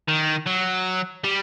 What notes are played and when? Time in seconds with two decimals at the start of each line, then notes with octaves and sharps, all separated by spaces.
0.09 D#3
0.47 F#3
1.24 G3